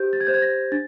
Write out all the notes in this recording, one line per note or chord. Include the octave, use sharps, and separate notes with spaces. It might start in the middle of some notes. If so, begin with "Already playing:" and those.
Already playing: G4 C5 G6
A6
G#6
C5 G6
G#6
A#6
D4 A6